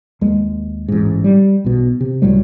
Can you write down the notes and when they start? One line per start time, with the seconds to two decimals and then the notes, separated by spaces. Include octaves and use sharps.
0.21 D#2 G#3
0.88 A1 G#2
1.24 G3
1.65 B1 B2
2.01 C3
2.22 C#2 A2 F#3 G3